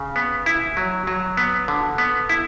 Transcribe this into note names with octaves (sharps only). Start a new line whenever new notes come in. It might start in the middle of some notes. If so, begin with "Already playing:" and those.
Already playing: C#3
B3
E4
F#3
F#3
B3
D3
B3
E4